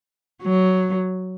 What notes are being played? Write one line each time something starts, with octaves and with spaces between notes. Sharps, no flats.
F#3